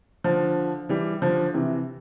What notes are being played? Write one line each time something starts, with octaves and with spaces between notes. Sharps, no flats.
D3 F3
E3 G3
D3 F3
C3 E3